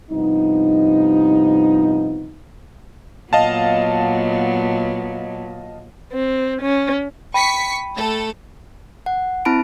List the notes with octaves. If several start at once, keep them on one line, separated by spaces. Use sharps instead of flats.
G2 C3 F3 B3 D#4
A#2 F#3 B3 D#5 F5 A5
C4
C#4
G5 B5 C#6 B6 C#7 D#7
A3 A4
F#5
C4 E4 A5 B5 D7